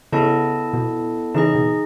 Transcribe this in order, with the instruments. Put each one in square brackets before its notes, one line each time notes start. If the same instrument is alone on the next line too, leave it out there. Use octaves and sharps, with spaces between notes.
[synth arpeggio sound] C#3 [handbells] B3 E4 A4 D#5 A5
[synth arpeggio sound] B2
[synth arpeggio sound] C#3 E3 [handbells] D#4 G#4 D#5
[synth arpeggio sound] B2